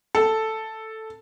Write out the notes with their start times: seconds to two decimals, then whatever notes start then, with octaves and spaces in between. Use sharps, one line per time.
0.15 A4